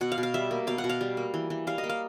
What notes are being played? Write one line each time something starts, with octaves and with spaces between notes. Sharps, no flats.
B2 F#5
F5
B2
F5
G3 E5
A#3
B2 F5
F#5
B2
F5
G3
A#3
E3
E3
G3 F5
D#5
A#3
F5